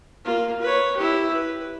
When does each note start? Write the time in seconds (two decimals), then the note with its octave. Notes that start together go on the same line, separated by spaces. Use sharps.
0.25 A#3 F4
0.62 B4 C#5
0.96 E4 G4
1.33 B4